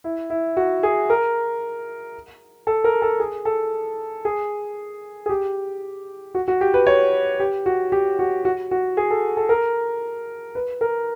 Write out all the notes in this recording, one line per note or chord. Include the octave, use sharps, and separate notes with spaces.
E4
E4
F#4
G#4
A#4
A4
A#4
A4
G#4
A4
G#4
G#4
G4
F#4
F#4
G4
B4
C#5
G4
F#4
G4
F#4
F#4
F#4
G#4
A4
A4
A#4
B4
A#4